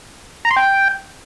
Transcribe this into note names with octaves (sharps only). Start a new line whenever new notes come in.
A#5
C6
G5